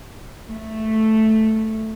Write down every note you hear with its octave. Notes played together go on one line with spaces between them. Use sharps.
A3